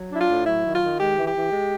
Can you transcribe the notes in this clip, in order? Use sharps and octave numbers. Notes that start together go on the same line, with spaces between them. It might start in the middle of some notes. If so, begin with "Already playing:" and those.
Already playing: F#3
D4 E4
F4
A2
F#3 E4
D#3
F4
D#3
G#3 G4
E3
G4
E3
G#3